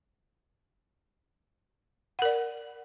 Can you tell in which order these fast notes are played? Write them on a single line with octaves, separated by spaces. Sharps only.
F#5 A#4 D5